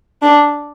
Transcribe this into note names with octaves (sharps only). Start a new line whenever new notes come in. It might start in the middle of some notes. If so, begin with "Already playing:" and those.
D4